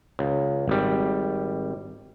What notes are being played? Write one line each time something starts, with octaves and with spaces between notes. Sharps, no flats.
C#2
G#1 G3